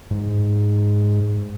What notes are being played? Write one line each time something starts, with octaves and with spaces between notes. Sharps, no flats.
G#2